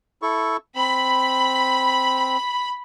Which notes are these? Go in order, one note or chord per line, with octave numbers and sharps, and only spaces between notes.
E4 A4 C#6
C4 B5